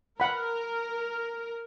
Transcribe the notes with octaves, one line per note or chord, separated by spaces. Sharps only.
A#4 F#5 B5